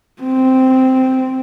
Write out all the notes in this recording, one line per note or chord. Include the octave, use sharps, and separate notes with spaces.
C4